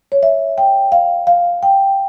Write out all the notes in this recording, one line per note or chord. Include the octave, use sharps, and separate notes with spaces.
C#5
E5
G5
F5
F5
G5